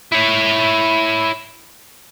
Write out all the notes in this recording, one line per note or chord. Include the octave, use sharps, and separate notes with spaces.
E4 C#5